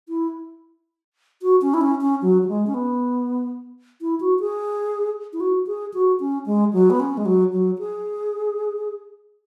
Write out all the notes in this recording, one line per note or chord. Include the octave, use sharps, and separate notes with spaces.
E4
F#4
C#4
E4
C#4
C#4
F#3
F#3
G#3
C#4
B3
E4
F#4
G#4
E4
F#4
G#4
F#4
C#4
G#3
F#3
B3
C#4
G#3
F#3
F#3
G#4